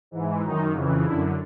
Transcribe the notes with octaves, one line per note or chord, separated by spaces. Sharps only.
G#2 E3
F#2 D#3 D#4
F2 C#3 E3
F#2 D3 E4